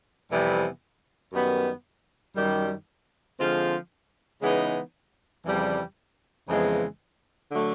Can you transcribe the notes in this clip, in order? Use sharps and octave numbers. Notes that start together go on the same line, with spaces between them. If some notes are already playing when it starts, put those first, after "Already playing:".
F2 C3 E3 G3 B3
F#2 D#3 G3 B3
F#2 D#3 G3
D3 F3 G#3 C4 F4
C#3 E3 G#3 B3 D#4
F2 C#3 E3 G3
F2 C#3 E3 G#3 B3
D3 F#3 A3